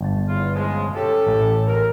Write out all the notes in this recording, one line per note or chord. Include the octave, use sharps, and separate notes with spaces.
G1 A5
E2 F4
C#3 F3 G#3
C#4 G4 A4
A1
A#4